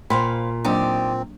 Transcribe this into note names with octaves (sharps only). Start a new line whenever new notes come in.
A#2 C5 F5 G5 B5 C6
F#3 A#3 C4 D4 D#4 G4 D5